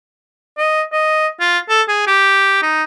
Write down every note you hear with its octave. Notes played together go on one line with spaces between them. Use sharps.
D#5
D#5
F4
A4
G#4
G4
D#4